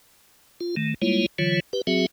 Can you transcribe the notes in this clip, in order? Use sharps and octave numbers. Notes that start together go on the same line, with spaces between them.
F4
D#3 A3
G3 G#3 A#3 E4 F4 C#5
D3 E3 F#3 F4 C#5
G4 B4
F#3 C4 F#4 G#4 E5